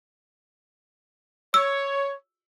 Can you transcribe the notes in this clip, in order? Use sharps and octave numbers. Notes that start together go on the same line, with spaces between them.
C#5 E6